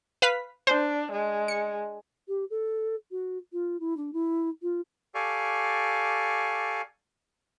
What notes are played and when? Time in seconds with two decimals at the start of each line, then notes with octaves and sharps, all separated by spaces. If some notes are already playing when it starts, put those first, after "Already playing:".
0.22 B4 F5 B6
0.67 D4 C5
1.12 G#3
1.48 C#7
2.28 G4
2.50 A4
3.11 F#4
3.53 F4
3.80 E4
3.97 D4
4.13 E4
4.62 F4
5.15 G4 A4 D5 F5 G#5 C#6